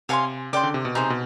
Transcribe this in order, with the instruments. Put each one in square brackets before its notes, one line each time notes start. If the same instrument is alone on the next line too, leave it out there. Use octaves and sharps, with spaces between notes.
[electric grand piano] C3 [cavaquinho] C#5 F5 G#5 C6
[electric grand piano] C#3 [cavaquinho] D5 G5 C6
[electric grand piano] D3
C3
B2
[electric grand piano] C3 [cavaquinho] D#4 G#4 C5
[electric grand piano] B2